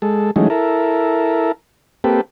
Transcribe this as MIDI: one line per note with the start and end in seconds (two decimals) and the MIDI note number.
0.02 0.31 56
0.02 0.31 69
0.36 0.48 52
0.36 0.48 54
0.36 0.48 56
0.36 0.48 57
0.36 0.48 61
0.36 0.48 63
0.50 1.52 64
0.50 1.52 69
0.50 1.52 70
2.04 2.21 58
2.04 2.21 60
2.04 2.21 67
2.04 2.21 69
2.04 2.21 71